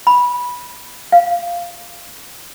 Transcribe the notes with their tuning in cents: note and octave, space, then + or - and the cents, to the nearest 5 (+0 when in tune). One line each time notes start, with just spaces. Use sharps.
B5 -15
F5 -10